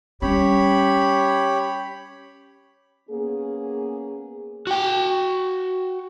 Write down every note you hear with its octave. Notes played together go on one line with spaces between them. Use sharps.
G3 C#4 G4 C#5 B5
A#3 B3 C#4 G#4
F#4 G5